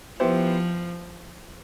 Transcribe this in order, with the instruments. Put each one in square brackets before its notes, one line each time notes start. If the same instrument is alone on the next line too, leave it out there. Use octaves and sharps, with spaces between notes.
[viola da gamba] F3 [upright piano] B3 E4 G4 C5